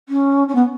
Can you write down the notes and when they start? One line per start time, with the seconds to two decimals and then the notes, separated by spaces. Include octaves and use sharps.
0.08 C#4
0.48 C#4
0.54 B3